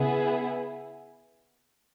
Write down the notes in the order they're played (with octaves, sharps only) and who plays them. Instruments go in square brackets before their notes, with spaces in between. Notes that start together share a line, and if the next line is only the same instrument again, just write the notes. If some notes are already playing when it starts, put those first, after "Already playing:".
Already playing: [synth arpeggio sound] C#3 [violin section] B3 E4 G#4